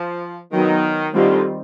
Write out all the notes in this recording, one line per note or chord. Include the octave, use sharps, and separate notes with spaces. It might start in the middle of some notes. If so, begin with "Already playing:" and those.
Already playing: F3
D#3 F#3 B3 D#4
D3 D#3 G3 C4 F4